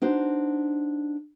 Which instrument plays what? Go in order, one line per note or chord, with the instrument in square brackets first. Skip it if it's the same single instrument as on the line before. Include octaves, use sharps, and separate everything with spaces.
[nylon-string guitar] D4 D#4 F#4 C5